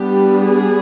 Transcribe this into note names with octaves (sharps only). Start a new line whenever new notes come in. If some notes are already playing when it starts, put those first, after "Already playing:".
Already playing: G3 B3 D4 G4
G#4